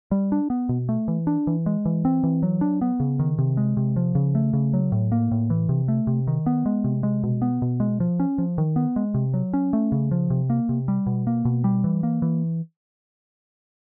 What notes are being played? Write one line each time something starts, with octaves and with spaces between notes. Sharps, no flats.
G3
D4
B3
B2
A3
E3
D4
E3
G#3
E3
C4
E3
F#3
D4
B3
C#3
D#3
C3
G#3
C3
F3
C#3
A3
C#3
F#3
A2
A#3
A2
E3
C3
A3
C3
D#3
B3
G#3
C3
G#3
B2
B3
B2
G#3
F3
C#4
F3
D#3
B3
G#3
C3
F#3
C#4
A3
C#3
F3
C3
A#3
C3
G3
B2
A#3
B2
G3
E3
A#3
E3